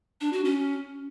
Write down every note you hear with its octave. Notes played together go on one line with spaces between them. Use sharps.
D4
F#4
C#4